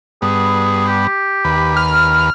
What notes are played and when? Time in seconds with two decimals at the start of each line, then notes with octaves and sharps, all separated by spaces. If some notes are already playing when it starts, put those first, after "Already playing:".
0.22 G2 B3 G#4
0.87 G4
1.45 D#2 B4
1.76 F6